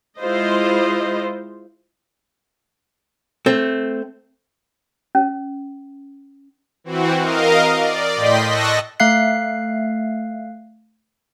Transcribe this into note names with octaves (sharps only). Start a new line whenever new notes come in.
G#3 E4 F4 C5 D#5
A3 C4
C#4
E3 C4 F#4
A#4 D#5 F5
D5
A2 D#5 G5 C6 B6
D#5 A5 C#6 E6 F#6 A#6
A3 E5 F5 F#6 C7